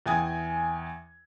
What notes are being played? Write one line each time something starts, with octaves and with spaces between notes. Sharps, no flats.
E2 E4 G5 G#5 D#6 G#6